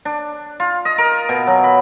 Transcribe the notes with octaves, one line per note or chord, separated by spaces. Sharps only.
D4
F4
D#5
A#4
B2
F#3
B5